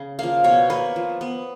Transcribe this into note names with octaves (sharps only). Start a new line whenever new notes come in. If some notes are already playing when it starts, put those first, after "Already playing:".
Already playing: C#3
F3 A#3 F5
B2 C#5
A#3 B4
F3
B3